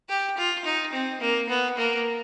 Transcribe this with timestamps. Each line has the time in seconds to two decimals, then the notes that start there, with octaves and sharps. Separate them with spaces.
0.09 G4
0.38 F4
0.65 D#4
0.93 C4
1.21 A#3
1.49 B3
1.78 A#3